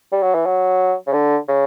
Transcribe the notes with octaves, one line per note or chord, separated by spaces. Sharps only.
G3
F#3
E3
F#3
C#3
D3
C#3